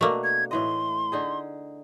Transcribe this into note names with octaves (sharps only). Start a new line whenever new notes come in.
B2 A3 A#3 D4
G#6
A2 E3 D#5 C6
D3 D#4 G#4